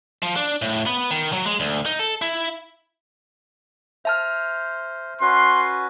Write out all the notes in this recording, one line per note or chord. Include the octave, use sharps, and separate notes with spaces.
F3
D4
A2
B3
D#3
F#3
G#3
D2
D#4
A4
E4
C5 E5 A5 F6
C#4 F#4 B4 C6